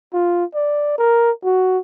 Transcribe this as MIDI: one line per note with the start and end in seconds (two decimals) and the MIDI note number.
0.13 0.45 65
0.55 0.97 74
0.98 1.31 70
1.45 1.78 66